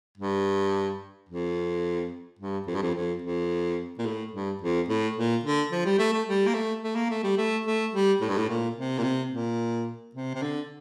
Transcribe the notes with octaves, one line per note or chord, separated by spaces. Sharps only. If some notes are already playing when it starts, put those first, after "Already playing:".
G2
F2
G2
F2
G2
F2
F2
F2
A#2
A2
G2
F2
A2
A#2
D3
F3
G3
A3
A3
G3
A#3
A3
A3
A#3
A3
G3
A3
A3
G3
A2
G2
A2
A#2
C3
A#2
C3
A#2
C3
C3
D3